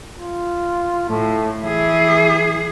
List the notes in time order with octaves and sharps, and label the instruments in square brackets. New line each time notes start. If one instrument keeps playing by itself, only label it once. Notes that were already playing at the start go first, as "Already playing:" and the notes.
[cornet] F4
[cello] A2 [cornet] A3
[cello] E3 G#4 [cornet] E5